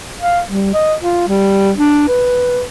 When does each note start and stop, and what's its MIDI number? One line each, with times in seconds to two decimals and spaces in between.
0.19 0.41 77
0.47 0.72 55
0.74 0.94 75
1.02 1.23 65
1.28 1.71 55
1.78 2.04 62
2.08 2.63 71